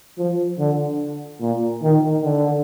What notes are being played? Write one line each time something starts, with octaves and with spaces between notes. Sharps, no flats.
F3
D3
A#2
D#3
D3